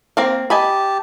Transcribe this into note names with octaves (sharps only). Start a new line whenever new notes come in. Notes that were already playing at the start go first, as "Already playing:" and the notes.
A#3 C4 F5
G4 D#5 G#5 A5 B5